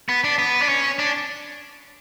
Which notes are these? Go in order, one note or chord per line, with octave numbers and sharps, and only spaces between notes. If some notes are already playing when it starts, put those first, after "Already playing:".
B3
D4
B3
D4
C#4
D4